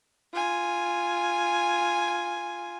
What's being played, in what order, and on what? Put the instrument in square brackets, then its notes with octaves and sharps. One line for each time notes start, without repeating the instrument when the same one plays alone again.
[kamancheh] F4 G#5